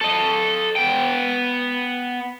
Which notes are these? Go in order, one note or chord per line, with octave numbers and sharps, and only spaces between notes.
A4 D#5
B3 G5